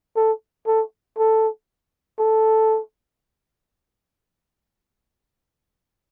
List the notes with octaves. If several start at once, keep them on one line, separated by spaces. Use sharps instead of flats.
A4
A4
A4
A4